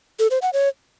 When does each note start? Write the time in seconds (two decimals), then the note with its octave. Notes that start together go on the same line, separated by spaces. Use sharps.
0.19 A4
0.31 C5
0.42 F#5
0.53 C#5